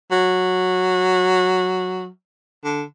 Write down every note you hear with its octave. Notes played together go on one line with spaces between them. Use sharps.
F#3
D3